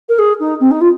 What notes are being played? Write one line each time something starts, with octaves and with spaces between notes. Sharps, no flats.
A#4
G#4
D#4
C4
D#4
F4